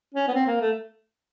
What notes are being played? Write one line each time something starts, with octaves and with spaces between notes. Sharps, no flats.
C#4
B3
C4
A#3
A3